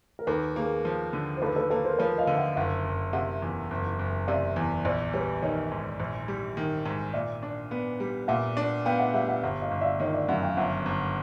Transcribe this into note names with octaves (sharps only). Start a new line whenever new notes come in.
A#4
D#2 A4 B4
A#3 G#4 A#4
F3
D3
C5
D#2 A4 B4
A4 B4
A#3 A4 B4
A#4 C5
F3 B4 C#5
D#5 F5
D3
E5 F#5
F#1 E5 F#5
F#1
C3 E5 F#5
E2
F#1
F#1
C3 D5 E5
E2
A#1 C5 D5
G3 B4 C#5
D#3 C#5 D#5
G#2
A#1
G3
D#3
G#2
A#2 D5 E5
D4
B3
G3
A#2 E5 F#5
D4
B3 F5 G5
E5 F#5
G3 E5 F#5
E5 F#5
G1 E5 F#5
D#5 F5
G1
D5 E5
D#3 C#5 D#5
D5 E5
F#2 E5 F#5
F5 G5
G1 E5 F#5
G1